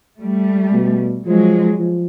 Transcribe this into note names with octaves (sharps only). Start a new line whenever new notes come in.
G3 A3
B2
F3 F#3 G#3
F3